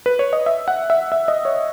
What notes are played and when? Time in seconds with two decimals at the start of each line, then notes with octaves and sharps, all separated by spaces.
0.06 B4
0.19 C#5
0.33 D#5
0.46 E5
0.68 F#5
0.90 E5
1.12 E5
1.28 D#5
1.45 C#5